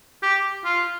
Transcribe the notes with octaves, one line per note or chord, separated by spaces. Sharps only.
G4
F4